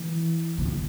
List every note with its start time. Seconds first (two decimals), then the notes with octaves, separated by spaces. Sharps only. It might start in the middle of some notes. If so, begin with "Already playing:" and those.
Already playing: E3
0.58 C3
0.65 D3